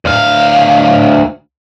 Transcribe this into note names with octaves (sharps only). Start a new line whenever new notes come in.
D2 F5